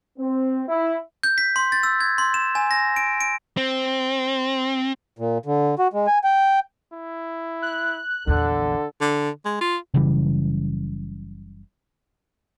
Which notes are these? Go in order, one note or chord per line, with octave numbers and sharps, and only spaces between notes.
C4
E4
G6
B6
C6
A6
E6
G#6
C6
E7
G#5
A#6
D7
D7
C4
A#2
D3
F#4
G#3
G#5
G5
E4
F#6
A#1 E2 D3 A4
D3
G#3
F4
F#1 C#3 E3 G3